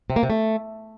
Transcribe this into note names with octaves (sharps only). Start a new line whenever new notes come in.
C3
A#3
C3
A3